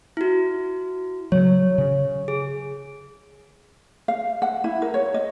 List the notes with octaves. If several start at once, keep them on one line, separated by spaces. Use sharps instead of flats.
E4 F#4
C#3 F#3 C#5
C#3
G#4
F5
F#5
E4
A#4
C#5
D#5